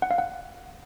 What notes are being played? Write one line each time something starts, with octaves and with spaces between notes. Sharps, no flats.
F#5
F5
F#5